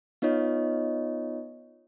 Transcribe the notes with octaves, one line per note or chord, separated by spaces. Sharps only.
B3 D#4 F4 C#5 D#5